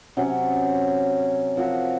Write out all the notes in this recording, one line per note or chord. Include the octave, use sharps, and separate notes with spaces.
C3 F#3 C#4
F3 C4 F#4 A#4